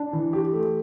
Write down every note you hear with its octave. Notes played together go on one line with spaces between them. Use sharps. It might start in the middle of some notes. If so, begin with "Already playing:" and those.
Already playing: D4
E3
G4
A3